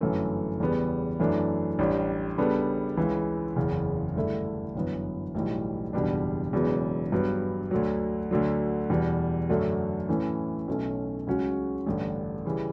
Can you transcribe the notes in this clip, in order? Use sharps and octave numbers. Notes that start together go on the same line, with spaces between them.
G1 F#2 E3 A3 C#4
E2 C#3 G3 B3
F#2 E3 A3 D4
A1 A2 G3 D4
C#3 G3 B3 D4 A4
C#2 C#3 E3
F#1 E2 C#3
G2 D3 A3 E4
G1 F#2 E3 B3
B1 A2 E3 G3
F#1 E2 B2 G3 D4
E1 E2 C#3 F#3 B3
G2 F#3 B3
D2 D3 F#3
D2 D3 F#3
E2 B2 G3
F#2 D3 A3 D4 F#4
A2 E3 A3 C#4 E4
B1 B2 A3 C#4
C#2 C#3 F#3 C#4 F#4
A1 G2 D3
C#3 E3 G3